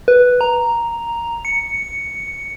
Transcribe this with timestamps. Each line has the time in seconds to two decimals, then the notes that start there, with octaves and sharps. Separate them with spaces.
0.08 B4
0.41 A#5
1.45 C#7